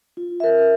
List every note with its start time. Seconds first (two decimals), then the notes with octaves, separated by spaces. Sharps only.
0.17 F4
0.40 A#4 E5